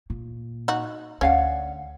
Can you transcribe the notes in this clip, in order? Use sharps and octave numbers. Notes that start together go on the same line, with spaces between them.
A#2
D#4 F#4
D2 C#4 D5 F5 F#5